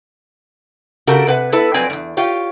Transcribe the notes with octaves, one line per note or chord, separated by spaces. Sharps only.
C#3 F#4 G4 A4 A#4
C3 B4 F#5
B3 E4 A4 B4
F2 F#3 C4 B4 D5 G#5
E2 G2
F4 G4 C#5